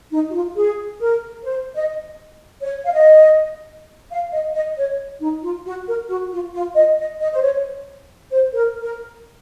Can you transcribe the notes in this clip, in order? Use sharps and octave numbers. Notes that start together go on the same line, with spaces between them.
D#4
F#4
F4
G#4
A#4
C5
D#5
C#5
F5
D#5
F5
D#5
D#5
C#5
D#4
F4
F#4
A#4
F#4
F4
F4
D#5
D#5
D#5
C5
C#5
C5
A#4
A#4